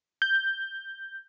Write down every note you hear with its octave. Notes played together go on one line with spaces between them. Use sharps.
G6